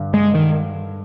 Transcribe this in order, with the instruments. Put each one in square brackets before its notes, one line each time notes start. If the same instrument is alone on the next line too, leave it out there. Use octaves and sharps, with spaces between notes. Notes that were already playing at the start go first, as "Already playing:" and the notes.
Already playing: [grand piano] G2 D3
[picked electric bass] G#3
D#3